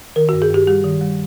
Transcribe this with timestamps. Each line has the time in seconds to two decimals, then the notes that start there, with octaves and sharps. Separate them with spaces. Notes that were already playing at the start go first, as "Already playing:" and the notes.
0.16 D#3 A#4
0.29 G2 F#4
0.42 G#4
0.51 G2 G4
0.67 G3 G4
0.84 D#3
1.01 G3